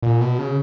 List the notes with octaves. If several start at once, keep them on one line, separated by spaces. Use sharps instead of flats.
A#2
B2
C#3